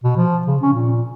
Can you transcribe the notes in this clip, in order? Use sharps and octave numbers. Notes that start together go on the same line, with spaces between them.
B2
F3
C#3
C#4
A#2